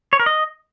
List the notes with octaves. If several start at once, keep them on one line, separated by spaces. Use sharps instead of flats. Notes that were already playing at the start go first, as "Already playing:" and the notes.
C#5
A#4
D#5